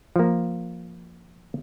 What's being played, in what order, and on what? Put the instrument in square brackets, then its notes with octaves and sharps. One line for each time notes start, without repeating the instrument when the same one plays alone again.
[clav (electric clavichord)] F3 A#3